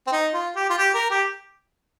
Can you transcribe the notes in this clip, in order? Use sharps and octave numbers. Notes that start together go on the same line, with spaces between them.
C4
D#4
F4
G4
F4
G4
A#4
G4